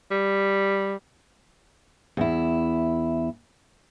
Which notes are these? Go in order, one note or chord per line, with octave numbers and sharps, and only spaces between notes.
G3
E2 E4